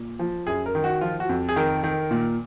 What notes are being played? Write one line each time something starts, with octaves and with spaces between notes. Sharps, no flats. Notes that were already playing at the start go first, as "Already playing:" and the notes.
Already playing: A#2
F3
F#2 G#4
A#4
D#3
F#4
F3 F4
F#4
F2
G#4
D#3 A#4
D#3
A#2